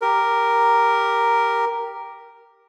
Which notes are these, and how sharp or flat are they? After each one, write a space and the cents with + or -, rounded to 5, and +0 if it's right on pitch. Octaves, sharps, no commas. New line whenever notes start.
G4 +0 A#4 +0